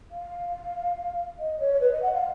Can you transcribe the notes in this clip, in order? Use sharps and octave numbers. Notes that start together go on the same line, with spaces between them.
F5
D#5
C#5
B4
D#5
F#5
F5